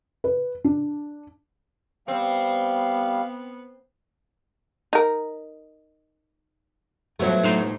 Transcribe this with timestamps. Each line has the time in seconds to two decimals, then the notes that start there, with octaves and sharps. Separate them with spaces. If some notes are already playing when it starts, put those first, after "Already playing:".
0.24 B4
0.64 D4
2.08 G3 B3 C4 F5
4.93 D#4 A#4
7.20 G2 B2 F3 F#3 A3
7.43 A2 D#4 C5